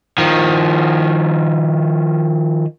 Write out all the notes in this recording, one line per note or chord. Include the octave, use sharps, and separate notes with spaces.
D#3 F3